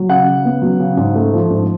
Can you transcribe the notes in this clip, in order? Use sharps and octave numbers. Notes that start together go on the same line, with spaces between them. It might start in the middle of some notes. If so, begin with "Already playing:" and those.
Already playing: F#3
C#3 F#5
C#3
B3
F#3
C#3
G#2
A3
F3
G#2